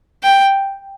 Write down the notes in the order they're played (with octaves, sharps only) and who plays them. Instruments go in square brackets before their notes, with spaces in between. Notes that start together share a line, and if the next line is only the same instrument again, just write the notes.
[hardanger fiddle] G5